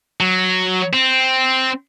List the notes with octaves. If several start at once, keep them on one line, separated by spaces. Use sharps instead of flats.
F#3
C4